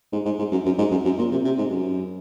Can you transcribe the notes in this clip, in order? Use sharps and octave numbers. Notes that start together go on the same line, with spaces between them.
G#2
G#2
G#2
F#2
F#2
G#2
F#2
F#2
A#2
C3
C3
G#2
F#2